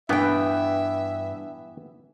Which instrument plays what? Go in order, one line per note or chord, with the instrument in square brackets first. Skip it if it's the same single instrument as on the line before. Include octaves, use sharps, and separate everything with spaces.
[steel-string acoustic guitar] G2 G5 [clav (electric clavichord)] E3 B3 [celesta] D4 [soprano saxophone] E5